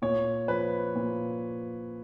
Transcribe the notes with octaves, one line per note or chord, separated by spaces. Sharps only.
A#2 C#5
F3 B4
A#2